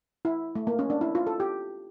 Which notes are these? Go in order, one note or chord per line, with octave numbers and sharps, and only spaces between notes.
E4
A3
A#3
C#4
D4
E4
F4
A4
G4